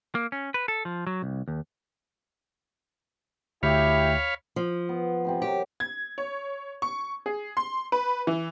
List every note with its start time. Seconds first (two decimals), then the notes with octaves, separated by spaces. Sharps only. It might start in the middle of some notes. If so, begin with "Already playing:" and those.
0.15 A#3
0.32 C#4
0.54 B4
0.68 A4
0.85 F3
1.07 F#3
1.22 C2
1.48 D#2
3.63 D2 E4 G4 C#5 F5 B5
4.56 F3
4.89 B3
5.25 C3 C4 B5
5.42 F#3 G4 A#4
5.80 G#6
6.18 C#5
6.82 C#6
7.26 G#4
7.57 C6
7.92 B4
8.27 E3